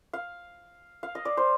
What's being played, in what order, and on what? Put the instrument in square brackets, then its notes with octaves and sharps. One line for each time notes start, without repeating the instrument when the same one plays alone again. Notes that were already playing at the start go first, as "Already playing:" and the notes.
[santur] F5
F5
D#5
D5
C5